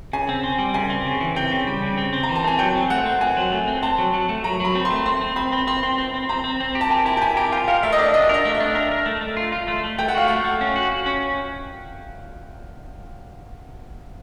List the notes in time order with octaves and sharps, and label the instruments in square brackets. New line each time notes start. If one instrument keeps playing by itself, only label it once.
[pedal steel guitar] C#3 [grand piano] G#5
[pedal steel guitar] C4
C4
G3
[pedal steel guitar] C#3 [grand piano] G#5
[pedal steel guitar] C4
C#3
E3
[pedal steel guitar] C4 [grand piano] G5
[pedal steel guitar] C#3
G3
C#3
C4
C4
[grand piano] A#5
[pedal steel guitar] E3
[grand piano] A5
[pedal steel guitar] C4 [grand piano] G#5
[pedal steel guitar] F#3 [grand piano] G5
[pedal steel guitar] C4
[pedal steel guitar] A3 [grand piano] F#5
[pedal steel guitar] C4
[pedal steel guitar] C4 [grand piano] G#5
[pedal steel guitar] F#3
A3
C4
[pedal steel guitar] C4 [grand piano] A5
[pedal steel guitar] F#3
F#3
A3
[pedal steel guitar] F#3 [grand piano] A#5
[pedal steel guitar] F#3 [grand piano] B5
[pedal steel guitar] C4
[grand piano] C6
[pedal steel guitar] A3
[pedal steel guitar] C4 [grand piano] C6
[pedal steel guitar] C4
[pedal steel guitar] C4 [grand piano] B5
[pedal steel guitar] C4
[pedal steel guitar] C4 [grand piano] C6
[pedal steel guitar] C4
C4
C4
[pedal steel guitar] C4 [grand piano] A#5
[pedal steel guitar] C4
C4
G4
[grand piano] A5
[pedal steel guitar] C4 [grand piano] G#5
[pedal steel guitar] E4 [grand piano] A5
[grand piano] G5
[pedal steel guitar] E4 [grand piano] G#5
[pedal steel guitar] G4 [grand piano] A#5
[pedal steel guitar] F4 [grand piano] G5
[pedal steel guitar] A#4 [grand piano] F5
[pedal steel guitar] A3 [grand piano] E5
[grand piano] D#5
[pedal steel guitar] D4 [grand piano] D5
[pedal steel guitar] D4 [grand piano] D#5
[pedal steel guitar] A#4 [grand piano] D#5
[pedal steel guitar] A3
[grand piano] E5
[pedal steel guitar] D4
A#4
A#4
A3
A3
F4
F4
A3
A3
[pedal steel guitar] A3 [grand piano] G5
[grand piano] F#5
[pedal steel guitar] F#4 [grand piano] F5
[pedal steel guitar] A3 [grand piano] F#5
[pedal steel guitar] A3
C#4
F#4
F#4
C#4